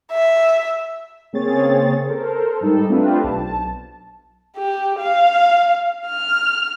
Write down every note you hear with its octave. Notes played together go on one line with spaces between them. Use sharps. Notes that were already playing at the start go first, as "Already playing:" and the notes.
E5
C#3 A#3 C4 G#4 C#5 A6
A4 A#4 C5
G#2 G3 D#4 A4
A3 C4 D4 F4 G4 B4
B1 A5
G4
F5
F6